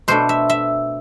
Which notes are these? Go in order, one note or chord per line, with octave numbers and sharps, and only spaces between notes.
B2 A3 D4 C5
E5
E5